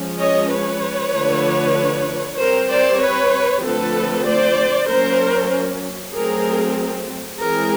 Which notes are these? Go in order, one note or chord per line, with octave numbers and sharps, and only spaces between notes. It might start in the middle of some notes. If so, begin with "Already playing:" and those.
Already playing: F3 G#3 C#4
C#5 D#5
B4 C#5
D3 F3 A3 D4
G3 C4 A#4 C5
C5 D5
B4 C#5
D3 F3 A3 C4 A4 B4
C5 D5
F#3 A#3 C#4 A#4 C5
F#3 A3 C4 G#4 A#4
E3 G#3 C4 G#4 A#4